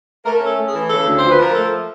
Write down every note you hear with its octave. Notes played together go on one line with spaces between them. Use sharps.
A3 A#4
C#4
A4
A3
G#4
E3
C#3 A4
D2
F3 C5
B4
F3
A#4
A3 A4